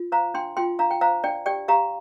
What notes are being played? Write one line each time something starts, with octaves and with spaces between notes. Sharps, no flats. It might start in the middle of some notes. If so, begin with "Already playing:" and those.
Already playing: F4
C5 F5 A#5
D4 G5 C6
F4 G5 C6
D4 F5 A#5
G5
C5 F5 A#5
D4 D5 G5
G4 D5 G5
G4 F5 A#5